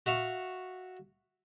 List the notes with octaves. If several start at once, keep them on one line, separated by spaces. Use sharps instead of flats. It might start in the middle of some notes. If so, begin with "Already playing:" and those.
F#4 E5 F5 C#6